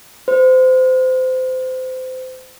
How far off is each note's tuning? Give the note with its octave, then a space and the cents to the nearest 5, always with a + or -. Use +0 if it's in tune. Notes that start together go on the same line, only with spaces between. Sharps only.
C5 -25